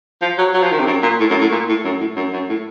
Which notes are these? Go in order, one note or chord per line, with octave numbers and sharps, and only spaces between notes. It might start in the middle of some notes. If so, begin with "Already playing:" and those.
F3
F#3
F#3
F3
D#3
C3
F#2
A#2
A2
F#2
A2
A#2
A2
F#2
A2
F#2
F#2
A2